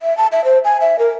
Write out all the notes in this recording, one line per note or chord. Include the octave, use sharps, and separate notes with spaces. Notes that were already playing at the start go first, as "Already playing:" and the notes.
E5
A5
E5
C5
G#5
E5
A#4